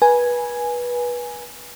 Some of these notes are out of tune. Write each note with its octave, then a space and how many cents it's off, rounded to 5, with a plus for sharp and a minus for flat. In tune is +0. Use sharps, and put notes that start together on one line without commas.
B4 -25 G#5 +0